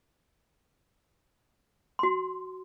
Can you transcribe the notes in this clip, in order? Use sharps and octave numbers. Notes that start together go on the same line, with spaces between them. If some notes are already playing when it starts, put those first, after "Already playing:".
F#4 C6